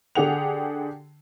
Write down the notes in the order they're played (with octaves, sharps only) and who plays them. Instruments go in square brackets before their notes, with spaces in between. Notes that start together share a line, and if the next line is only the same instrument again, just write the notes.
[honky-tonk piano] D3 G4 G#4 F#5 G5 F7